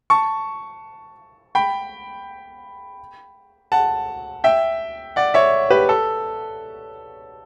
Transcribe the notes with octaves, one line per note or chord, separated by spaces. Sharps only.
A5 C#6
G5 B5
F#5 A5
E5 G5
D5 F#5
C#5 E5
G4 B4
A4